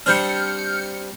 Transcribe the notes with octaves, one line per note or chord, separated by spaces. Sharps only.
G3 C4 D4 F6 G6 C#7